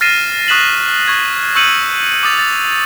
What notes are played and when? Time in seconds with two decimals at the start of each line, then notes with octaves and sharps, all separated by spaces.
0.01 F6 A6 A#6 C7 D#7 E7
0.48 C#6 D#6 F#6 B6 E7 F#7
1.08 C#6 G#6
1.55 C#6 E6 G6 C#7 D#7 F#7
2.23 D6 D#6 A6 F7
2.39 A6